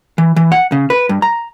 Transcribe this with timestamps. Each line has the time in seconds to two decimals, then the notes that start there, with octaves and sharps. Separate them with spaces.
0.18 E3
0.36 E3
0.52 F#5
0.72 C#3
0.90 B4
1.09 G2
1.22 A#5